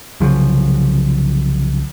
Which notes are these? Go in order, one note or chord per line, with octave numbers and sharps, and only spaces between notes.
C2 C#3 F3 F#3